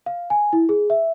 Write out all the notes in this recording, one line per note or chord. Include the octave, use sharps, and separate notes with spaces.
F5
G#5
E4
G#4
E5